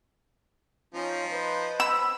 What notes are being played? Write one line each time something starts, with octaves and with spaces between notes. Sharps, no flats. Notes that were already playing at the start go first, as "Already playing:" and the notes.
F3 C#4 D#4 F4 C5
B4 C5 D#5
B5 E6